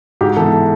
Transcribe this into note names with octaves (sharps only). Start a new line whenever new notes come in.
G#2 G4
E3 G#3 B3 A4